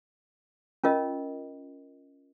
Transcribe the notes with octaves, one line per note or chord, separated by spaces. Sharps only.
C#4 F4 A#4 D#5